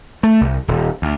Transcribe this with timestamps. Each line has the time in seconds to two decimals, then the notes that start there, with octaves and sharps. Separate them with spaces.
0.23 A3
0.41 C2
0.68 D#1
1.02 D2